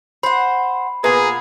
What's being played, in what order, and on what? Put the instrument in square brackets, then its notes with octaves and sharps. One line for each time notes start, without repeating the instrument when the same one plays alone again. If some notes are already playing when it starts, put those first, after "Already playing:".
[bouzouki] C5 F#5 [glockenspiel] B5 C7
[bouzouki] A#2 B3 [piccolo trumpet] G#4 [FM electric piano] B4 A#5